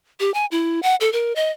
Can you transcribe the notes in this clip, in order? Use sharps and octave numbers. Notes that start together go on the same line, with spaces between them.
G4
G#5
E4
F#5
A4
A#4
D#5